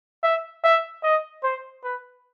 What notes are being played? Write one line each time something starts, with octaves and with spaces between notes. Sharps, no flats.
E5
E5
D#5
C5
B4